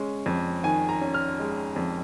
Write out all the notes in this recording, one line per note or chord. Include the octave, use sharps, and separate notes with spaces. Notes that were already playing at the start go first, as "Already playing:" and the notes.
Already playing: G#3 C#4
F2
D#3 G#5
A#5
C#4
F6
G#3
F2